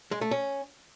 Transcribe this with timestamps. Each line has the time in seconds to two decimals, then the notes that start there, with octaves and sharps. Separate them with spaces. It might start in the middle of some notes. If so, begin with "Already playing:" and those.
0.11 G#3
0.21 A3
0.31 C#4